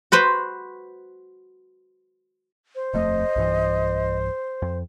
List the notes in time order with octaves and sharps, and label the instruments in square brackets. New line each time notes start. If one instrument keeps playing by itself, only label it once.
[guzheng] F#4 B4 C5 B5
[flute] C5
[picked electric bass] D#1 F2 A3 [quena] D#5
[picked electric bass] B1 G2 E3
F2